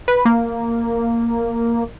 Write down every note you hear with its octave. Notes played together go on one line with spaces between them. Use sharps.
B4
A#3